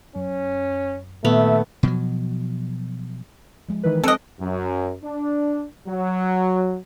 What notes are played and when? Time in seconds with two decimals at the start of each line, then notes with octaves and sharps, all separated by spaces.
0.16 F#2 C#4
1.25 A#2 D#3 A3 B3 E5
1.83 B2 F3 F#3
3.69 F3 G#3
3.83 D#3 E3 B4
4.04 C4 A4 D#5 F#6 D7
4.40 F#2
5.04 D4
5.88 F#3